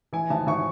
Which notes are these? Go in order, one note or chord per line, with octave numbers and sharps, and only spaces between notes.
E3 G#5
G#1 A5
G#1 C#6